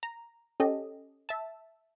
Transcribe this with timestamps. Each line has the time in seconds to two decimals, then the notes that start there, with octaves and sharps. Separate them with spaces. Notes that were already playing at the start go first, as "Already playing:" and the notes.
0.03 A#5
0.60 C#4 G4 A4 D#5
1.29 E5 A5